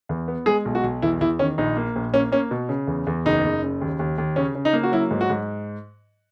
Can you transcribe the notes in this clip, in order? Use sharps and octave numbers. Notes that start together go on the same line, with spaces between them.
E2
B3
G#3 G#4
B1
F#4
B1
E2 E4
E2 E4
D#3 C#4
A#1 D#4
A#3
A#1
A#3 C#4
A#3 C#4
B2
C#3
E2
E2
F#1 D#4
F#1
C#3
D#2
D#2
D#2
C#3 C#4
C#3
D#4
A#3
F#4
F#3 E4
G#2
F#4
G#2